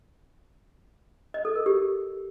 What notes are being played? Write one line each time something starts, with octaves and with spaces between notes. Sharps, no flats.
D#5
A4
A#4
G4